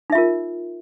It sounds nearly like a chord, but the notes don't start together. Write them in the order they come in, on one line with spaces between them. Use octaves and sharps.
D#4 E5 F4 A#4